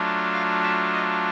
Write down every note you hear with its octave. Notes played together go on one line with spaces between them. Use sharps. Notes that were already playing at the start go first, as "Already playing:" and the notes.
Already playing: F#3 A3 D4 F4
F5
E5
D#5